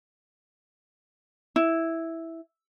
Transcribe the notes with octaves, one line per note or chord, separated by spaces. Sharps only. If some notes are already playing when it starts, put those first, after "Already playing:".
E4